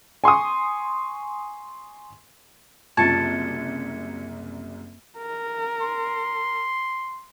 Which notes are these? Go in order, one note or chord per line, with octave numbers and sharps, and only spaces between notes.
G#5 C6 C#6 D#6
F#1 C2 F#2 C#4 F4 A5 G#6 C#7
A#4
C6